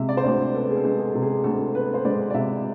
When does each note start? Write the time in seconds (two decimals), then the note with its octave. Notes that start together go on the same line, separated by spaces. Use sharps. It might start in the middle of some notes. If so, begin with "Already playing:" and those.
Already playing: C3 G#3 E5
0.09 D5
0.17 C5
0.24 D2 D5
0.54 B3 A4
0.70 G#4
0.77 A4
0.85 G#3
0.99 G#4
1.14 C3
1.22 G#4
1.44 D2 A4
1.74 B3 B4
1.94 C5
2.05 G#3 D5
2.30 D5
2.34 C3 E5